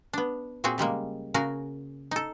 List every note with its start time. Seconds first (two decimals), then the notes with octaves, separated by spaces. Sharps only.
0.13 B3 D4
0.64 A#2 C4 F#4 G#4
0.78 C#3 G3 G#3 A#3
1.34 C#3 F#4 G#4 A#4
2.11 D#4 A4